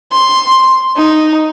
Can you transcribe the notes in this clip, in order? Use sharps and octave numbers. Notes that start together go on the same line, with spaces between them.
C6
D#4